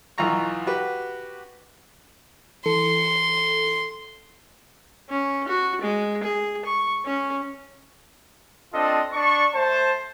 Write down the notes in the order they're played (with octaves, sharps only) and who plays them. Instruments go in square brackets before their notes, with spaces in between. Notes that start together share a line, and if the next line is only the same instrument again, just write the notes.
[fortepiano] B1 E3 F4 A#5 C#6
F#4 G4 B4
[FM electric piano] E3 A4 C#7 [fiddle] C6
[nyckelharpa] C#4
F#4
G#3
G#4
C#6
C#4
[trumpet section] C4 D4 F4 A4 D#5
D4 D5 C#6
A3 C5 A5